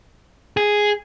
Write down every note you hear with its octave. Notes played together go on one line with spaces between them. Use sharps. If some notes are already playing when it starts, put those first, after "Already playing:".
G#4